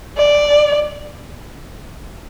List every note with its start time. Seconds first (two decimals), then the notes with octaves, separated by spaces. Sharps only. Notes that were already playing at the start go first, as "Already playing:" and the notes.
0.18 D5